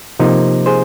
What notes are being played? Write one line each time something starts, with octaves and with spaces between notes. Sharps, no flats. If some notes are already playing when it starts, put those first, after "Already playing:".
C3 F3 A#3 D#4
G#4 C5